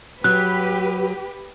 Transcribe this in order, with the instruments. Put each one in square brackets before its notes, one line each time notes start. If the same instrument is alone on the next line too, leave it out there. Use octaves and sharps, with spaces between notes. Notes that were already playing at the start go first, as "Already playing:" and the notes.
[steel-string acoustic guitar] F#3 [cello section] G4 B4 [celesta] F#6